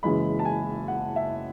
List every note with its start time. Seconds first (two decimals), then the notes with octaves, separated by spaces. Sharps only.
0.03 F#1 F#2 E3 G#3 B5
0.39 A5
0.45 G#5
0.88 F#5
1.16 E5